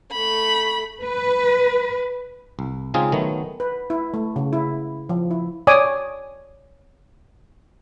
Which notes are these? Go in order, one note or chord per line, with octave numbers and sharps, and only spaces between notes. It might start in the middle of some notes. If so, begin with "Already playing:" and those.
A3 B5
B4
C2
C#3 G#3 C4 D#4 F4 G#4
D#3 F#3 A3 B3
B4
E4
A3
C#3
E4
F3
E4
C#5 D5 G#5 D6 D#6